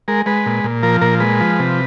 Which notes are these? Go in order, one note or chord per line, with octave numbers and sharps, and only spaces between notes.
G#3 A#4
G#3 B4
A#2
A#2
F3 A#4
A#2 A#4
G#3 B4
F3
C3